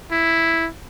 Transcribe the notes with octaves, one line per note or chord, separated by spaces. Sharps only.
E4